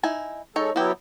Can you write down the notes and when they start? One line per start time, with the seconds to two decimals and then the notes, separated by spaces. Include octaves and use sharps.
0.03 D#4 E4 G#5
0.56 G#3 D#4 A4 C#5
0.76 F#3 B3 E4 F#4 G4